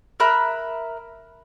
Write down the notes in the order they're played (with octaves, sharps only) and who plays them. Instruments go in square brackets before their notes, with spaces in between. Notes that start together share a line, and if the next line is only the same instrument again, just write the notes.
[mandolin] A#4 E5 B5 F#6